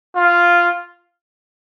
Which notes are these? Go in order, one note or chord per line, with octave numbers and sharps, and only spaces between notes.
F4